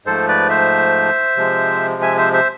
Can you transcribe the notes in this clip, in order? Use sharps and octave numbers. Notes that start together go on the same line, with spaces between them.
G#2 F3 A3 A4 C5
B4 D5
C5 E5
C3 F3 G#3
E5 G#5
C5 E5
C5 E5